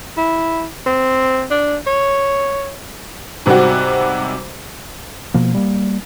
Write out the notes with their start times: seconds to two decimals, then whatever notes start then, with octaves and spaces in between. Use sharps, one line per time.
0.18 E4
0.86 C4
1.50 D4
1.87 C#5
3.46 G#2 C3 G3 C4 F#4
5.34 B2 F3 A#3
5.55 G3 A#3